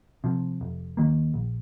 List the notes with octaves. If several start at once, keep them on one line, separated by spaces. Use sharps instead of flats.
C3 F3
F1
D#2 D#3 A#3
A#1